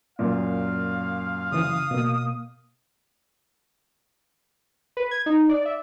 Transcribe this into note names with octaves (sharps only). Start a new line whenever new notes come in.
F#2 A#2 F5
C#3 E3 D#6
B2 A#3
B4
G#6
D#4
D5
E5